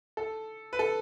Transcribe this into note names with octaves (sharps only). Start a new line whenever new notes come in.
A4
B4
A4